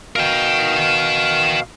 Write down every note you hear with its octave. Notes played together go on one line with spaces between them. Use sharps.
B2 A#4 F5 G5